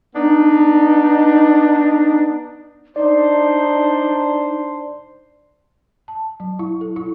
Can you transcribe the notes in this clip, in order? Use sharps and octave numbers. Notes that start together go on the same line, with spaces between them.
B3 D4 D#4
D4 D#4 C5 D5
A5
F#3
E4
A4
E4